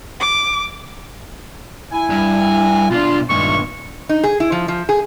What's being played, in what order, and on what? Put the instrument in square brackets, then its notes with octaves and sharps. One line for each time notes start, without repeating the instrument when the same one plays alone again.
[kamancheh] D6
[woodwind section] E4 G#5
[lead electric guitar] G2
[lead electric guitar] B2 D4 [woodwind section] F4
[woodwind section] G2 G#3 C#6 [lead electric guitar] A#2 D#3
[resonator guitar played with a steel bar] D#4
G#4
E4
F3
F3
G#4